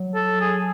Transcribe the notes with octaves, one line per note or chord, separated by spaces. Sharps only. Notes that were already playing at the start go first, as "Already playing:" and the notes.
Already playing: F#3
A4
G#4